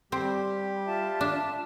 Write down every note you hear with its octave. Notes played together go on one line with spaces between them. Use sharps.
G3 C4 G4
F4 E5 A5
D4